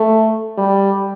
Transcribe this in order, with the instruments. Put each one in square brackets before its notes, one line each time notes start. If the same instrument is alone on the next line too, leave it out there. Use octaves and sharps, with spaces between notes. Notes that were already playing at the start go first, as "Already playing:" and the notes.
Already playing: [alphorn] A3
G3